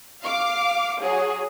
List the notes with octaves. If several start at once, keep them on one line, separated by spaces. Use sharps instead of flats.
F5 D6
F#3 G#4